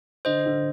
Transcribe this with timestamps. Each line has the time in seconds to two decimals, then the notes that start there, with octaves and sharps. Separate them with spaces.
0.25 D3 C5 D#5
0.46 D3